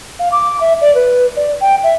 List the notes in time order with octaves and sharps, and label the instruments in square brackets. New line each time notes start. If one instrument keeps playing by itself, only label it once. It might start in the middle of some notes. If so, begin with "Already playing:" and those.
[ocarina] F5
D6
E5
D5
B4
D5
G5
E5